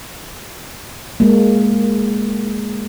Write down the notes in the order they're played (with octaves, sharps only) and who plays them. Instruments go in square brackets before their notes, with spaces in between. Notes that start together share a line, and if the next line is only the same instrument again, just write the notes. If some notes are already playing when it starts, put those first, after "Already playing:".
[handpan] G#3 A#3